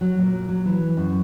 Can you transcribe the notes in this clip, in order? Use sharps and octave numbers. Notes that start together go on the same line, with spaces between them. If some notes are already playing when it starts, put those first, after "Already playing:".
F#3
A#2
F#3
E3
F#2